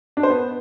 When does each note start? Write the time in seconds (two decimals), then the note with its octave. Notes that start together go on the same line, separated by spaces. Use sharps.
0.17 D4
0.23 C5
0.30 B3